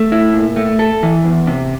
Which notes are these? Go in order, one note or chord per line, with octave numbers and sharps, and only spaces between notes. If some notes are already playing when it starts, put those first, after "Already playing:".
Already playing: A3
E4
A#2
A3
A4
E3
E2
C3